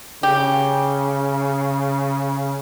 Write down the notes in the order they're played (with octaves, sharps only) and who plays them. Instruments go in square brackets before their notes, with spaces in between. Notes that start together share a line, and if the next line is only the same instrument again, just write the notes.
[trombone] C#3 [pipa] G4